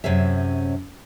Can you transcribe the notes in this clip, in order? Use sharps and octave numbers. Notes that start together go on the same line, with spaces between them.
F#2 C3 C#4 G#4 E5